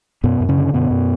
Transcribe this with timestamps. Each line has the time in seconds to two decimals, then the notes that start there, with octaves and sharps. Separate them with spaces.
0.24 F#2 B2 B3
0.40 F#2
0.49 C#3 C#4
0.57 D3
0.73 F#2 B2 B3
0.90 F#2